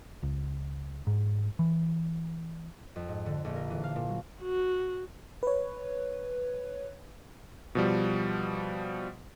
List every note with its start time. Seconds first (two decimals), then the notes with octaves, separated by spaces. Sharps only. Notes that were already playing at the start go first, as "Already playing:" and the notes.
0.23 C#2
1.07 G#2
1.59 E3
2.96 F2
3.08 G#2
3.26 D3
3.45 A#1
3.56 A#4
3.70 E3
3.84 F5
3.96 A#2
4.09 F#3
4.42 F#4
5.43 B4 C#5
7.75 B2 F3 G3